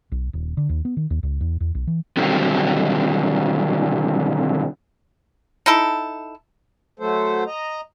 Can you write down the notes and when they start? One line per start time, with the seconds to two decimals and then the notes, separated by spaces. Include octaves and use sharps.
0.12 B1
0.33 D#1
0.57 D3
0.69 D#2
0.85 B3
0.97 D#3
1.10 D#2
1.23 C#2
1.41 E2
1.60 E2
1.75 B1
1.87 E3
2.17 B2 D3 D#3 F#3 G3 C4
5.66 D#4 E4 A4
7.00 F#3 A3 A4 C5
7.47 D#5 A#5